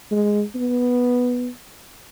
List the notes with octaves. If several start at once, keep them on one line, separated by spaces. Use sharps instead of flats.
G#3
B3